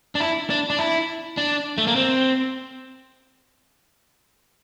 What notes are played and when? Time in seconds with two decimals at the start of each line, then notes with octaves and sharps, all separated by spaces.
0.15 D4
0.20 E4
0.50 D4
0.70 D4
0.79 E4
1.37 D4
1.78 A3
1.87 A#3
1.96 C4